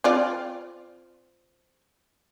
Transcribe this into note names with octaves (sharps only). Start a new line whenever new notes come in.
C4 F4 D5